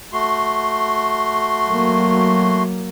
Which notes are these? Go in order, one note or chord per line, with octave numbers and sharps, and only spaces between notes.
A3 F#4 C6
F#3 A#3